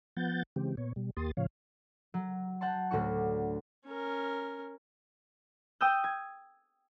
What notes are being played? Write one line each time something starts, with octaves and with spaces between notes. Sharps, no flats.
F3 B3 F#5 G6 A6
C#3 E3 G#3 C4 G4
A#2 B3 C#5
B2 G3
D#2 A#3 G4 C6 D#6 A6
A2 C#3 F3 C#5 F5
F#3
F#5 G5 A5 C6
D2 A2 D3 F#4 C#6
C#4 A#4
G5 D#6 E6 G6
G#6